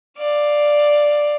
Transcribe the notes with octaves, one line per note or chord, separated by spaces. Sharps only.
D5 F5